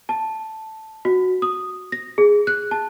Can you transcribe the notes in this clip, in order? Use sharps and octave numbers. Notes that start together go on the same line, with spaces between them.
A5
F#4
D#6
A#6
G#4
F#6
A5